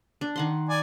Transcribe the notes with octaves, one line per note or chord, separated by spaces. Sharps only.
D4
D#3 F#5 C6
D5 G#5